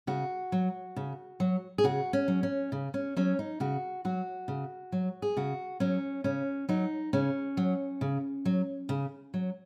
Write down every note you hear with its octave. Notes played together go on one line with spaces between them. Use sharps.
C#3 F#4
F#3
C#3
F#3
G#4
C#3 F#4
C#4
F#3
C#4
C#3
C#4
F#3 C#4
D#4
C#3 F#4
F#3 F#4
C#3
F#3
G#4
C#3 F#4
F#3 C#4
C#3 C#4
F#3 D#4
C#3 C#4
F#3
C#3
F#3
C#3
F#3